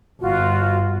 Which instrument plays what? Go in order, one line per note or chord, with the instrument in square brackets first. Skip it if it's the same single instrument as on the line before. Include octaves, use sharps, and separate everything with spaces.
[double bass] G1 [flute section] F4 F#4